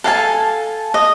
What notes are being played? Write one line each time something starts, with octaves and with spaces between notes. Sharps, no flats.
A4 F5 G#5 A5
D#5